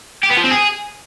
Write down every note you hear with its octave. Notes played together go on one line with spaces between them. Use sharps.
G4
B3
F3
C4
G#4